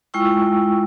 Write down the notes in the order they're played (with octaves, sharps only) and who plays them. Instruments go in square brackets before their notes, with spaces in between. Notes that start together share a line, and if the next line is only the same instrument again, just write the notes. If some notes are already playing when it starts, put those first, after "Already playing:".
[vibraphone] G#3 E4 F4 G5 C#6 E6